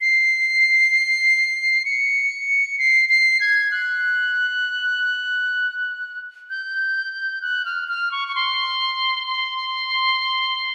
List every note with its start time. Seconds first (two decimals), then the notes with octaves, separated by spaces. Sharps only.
0.01 C7
1.85 C#7
2.79 C7
3.09 C7
3.41 G#6
3.71 F#6
6.50 G6
7.42 F#6
7.65 F6
7.88 F6
8.12 C#6
8.28 C#6
8.35 C6
9.27 C6